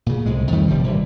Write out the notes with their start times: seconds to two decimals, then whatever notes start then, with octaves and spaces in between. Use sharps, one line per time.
0.06 A#2 C#3
0.26 C2 A2 G#3
0.52 F2 D#3 G3 A3
0.68 G1 C3 F3 G3
0.84 G#1 A#2 E3 G3